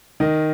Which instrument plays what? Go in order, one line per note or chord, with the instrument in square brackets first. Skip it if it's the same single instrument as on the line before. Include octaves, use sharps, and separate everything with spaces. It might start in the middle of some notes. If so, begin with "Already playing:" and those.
[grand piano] D#3 D#5